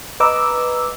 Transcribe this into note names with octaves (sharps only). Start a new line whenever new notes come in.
B4 D#5 A#5 D6 E6